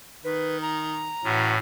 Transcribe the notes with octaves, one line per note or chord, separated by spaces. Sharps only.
D#3 B4
A#5
A2 E3 C#4 F#4